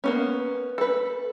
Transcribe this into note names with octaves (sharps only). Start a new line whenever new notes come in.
A#3 B3 C#4
A4 B4